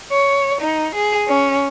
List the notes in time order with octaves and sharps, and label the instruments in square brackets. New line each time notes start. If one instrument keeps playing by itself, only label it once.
[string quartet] C#5
D#4
G#4
C#4